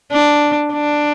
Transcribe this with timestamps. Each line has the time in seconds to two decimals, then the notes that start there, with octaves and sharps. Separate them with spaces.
0.12 D4
0.73 D4